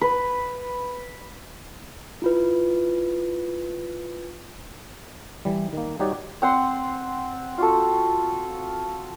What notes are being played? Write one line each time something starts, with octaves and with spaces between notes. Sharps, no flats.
B4
E4 F4 B4
E3 G3
D#3 A#3
G3 D#4 F#4 G4 C#5 D5
C4 F#5 C6
F4 F#4 A4